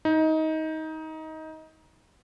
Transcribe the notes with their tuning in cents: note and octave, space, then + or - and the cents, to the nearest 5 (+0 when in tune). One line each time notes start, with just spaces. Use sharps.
D#4 +20